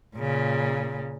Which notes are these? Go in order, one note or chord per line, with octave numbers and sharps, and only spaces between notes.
A#2 C#3